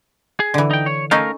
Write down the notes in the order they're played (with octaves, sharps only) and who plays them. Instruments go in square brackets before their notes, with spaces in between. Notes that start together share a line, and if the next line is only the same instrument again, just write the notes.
[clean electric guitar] G#4
[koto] D3 E3
[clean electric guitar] D#4 G5
C#5
[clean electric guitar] A3 A#4 F5 [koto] C#4 D#4 A4